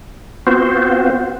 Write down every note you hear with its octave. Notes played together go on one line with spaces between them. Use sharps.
B3 C4 F4 F#4 C5